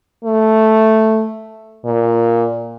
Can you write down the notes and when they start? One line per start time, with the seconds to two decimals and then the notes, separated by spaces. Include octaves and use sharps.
0.25 A3
1.85 A#2